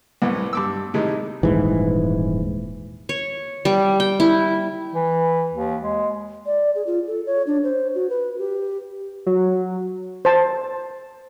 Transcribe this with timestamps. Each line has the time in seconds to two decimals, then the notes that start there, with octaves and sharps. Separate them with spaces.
0.22 C2 A2 B3
0.53 G2 D6 E6
0.94 A2 C3 D#3 G#3
1.43 D#1 G#2 E3
3.09 C#5
3.65 G3
4.00 G5
4.20 E4
4.94 E3
5.54 D#2
5.82 G#3
6.46 D5
6.75 G#4
6.87 F4
7.07 A4
7.26 C#5
7.47 D4
7.64 C5
7.95 F#4
8.10 B4
8.39 G4
9.26 F#3
10.25 C5 A5